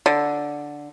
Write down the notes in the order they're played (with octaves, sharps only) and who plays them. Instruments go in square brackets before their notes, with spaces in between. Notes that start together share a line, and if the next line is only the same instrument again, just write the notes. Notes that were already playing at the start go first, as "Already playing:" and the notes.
[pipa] D3